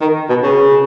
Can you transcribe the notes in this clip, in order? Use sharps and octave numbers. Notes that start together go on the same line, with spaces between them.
D#3
B2
C#3